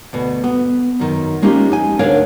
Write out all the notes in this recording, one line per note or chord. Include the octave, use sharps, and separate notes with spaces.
D2 B2
B3
F#2 D#3
G#3 A#3 C#4 D#4 F4 G4
F2 D#4 G#5
D2 D4 A#4 C#5 F5